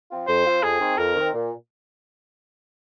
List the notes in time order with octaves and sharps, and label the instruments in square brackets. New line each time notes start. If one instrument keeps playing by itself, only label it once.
[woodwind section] F3 C4 F4
[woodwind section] F2 [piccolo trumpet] C5
[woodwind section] F3 C4 F4
[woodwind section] F2 [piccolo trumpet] G#4
[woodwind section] D#3 C4
[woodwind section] F2 [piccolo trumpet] A#4
[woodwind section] D#3 C4
A#2